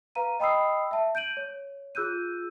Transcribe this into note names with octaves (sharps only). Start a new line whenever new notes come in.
B4 F5 A#5 D#7
D#5 G5 B5 D#6 E6 C7
E5 A5
G6 D7 D#7 F#7
C#5
F4 G#4 E6 F#6 G6 D#7